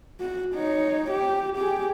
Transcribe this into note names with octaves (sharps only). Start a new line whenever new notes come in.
F#4
D#4 C#5
G4
G4 G#4